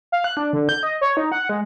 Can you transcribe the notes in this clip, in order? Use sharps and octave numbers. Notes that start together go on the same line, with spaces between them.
F5
F#6
D4
D3
G6
D#5
C#5
D#4
F#5
G#3